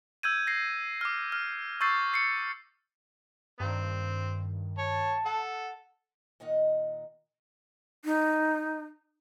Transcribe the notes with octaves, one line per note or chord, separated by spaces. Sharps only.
E6 G6 G#6 D#7
A#6 C7
D6 F6
F6
C#6 E6 G6 A6 C7
C7 C#7
G2 D#3 C4
C#5 A5
A4 F#5
A#2 D#3 D#4 D#5 F#5
D#4